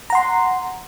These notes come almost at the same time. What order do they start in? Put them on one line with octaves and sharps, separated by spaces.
A#5 F#5 C6